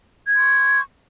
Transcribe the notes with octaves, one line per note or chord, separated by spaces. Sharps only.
C6 C#6 G6 G#6